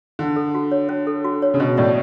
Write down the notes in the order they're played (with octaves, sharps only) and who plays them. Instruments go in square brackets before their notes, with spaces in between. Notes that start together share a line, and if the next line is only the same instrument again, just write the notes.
[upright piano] D3 [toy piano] C#4
[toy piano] A4
F#4
C#5
C#4
A4
F#4
C#5
[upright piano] C#3
[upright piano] B2 [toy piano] C#4
[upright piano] A2 [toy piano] D5